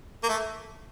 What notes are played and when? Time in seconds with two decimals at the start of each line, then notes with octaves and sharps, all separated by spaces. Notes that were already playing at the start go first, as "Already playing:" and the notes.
0.23 A#3
0.29 A3